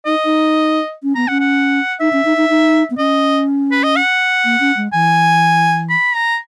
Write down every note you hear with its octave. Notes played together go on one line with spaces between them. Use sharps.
D#4 D#5
D#4
C#4
B3 A#5
C#4 F#5
F#5
D#4 E5
C#4
D#4
D#4
D#4
B3
C#4 D#5
B4
D#5
F#5
A#3
C#4
G#3
E3 G#5
B5
A#5